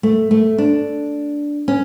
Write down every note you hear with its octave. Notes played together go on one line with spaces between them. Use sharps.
A3
A3
D4
C#4